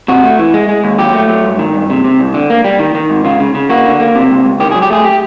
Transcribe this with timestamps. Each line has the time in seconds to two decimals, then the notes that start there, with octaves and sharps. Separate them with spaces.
0.08 C3 F#4
0.23 A3
0.39 E3
0.54 G#3
0.69 G#3
0.84 D#2
0.98 F#3 G4
1.14 A3
1.29 F#3
1.44 G2
1.59 D#3
1.74 G2
1.90 C3
2.04 C3
2.20 C2
2.34 D3
2.50 A#3
2.64 G3
2.79 D#3
2.95 D#3
3.10 G#2
3.25 C#3 F4
3.40 C#3
3.55 C#3
3.69 A#3 F#4
3.85 D3
4.00 A#3
4.15 C3
4.30 C#2
4.45 C#2
4.60 D#3 G4
4.71 F#3 G#4
4.82 G4
4.90 A3 G#4
5.04 G4